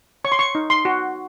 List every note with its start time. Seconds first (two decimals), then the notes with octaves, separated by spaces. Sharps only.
0.25 C#5 C#6
0.32 C6
0.39 C#6
0.55 D#4
0.70 C6
0.85 F#4